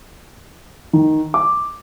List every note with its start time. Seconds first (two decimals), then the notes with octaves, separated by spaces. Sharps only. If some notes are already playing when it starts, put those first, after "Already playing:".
0.93 D#3
1.34 D6